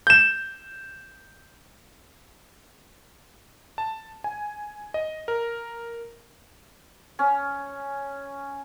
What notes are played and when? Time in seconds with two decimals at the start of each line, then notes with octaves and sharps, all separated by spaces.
0.07 G6 E7
3.78 A5
4.24 G#5
4.94 D#5
5.28 A#4
7.19 C#4